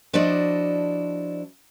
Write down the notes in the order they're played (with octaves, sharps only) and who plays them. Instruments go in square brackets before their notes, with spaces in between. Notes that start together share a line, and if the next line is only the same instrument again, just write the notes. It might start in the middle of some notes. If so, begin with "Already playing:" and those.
[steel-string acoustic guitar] F3 D4 E4 F#4 D5 D#5